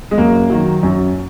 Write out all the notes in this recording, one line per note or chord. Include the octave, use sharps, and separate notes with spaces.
G#3
F#2 A#3
D#3 F#3
F#2